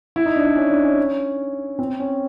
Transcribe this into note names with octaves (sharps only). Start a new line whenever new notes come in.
E4
D#4
D4
D4
C#4
D4
C#4
C4
C#4